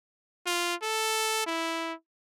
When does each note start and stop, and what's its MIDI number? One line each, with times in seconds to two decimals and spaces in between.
0.46 0.75 65
0.83 1.44 69
1.46 1.93 64